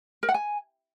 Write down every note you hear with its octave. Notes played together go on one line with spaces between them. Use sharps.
A#4
F#5
G#5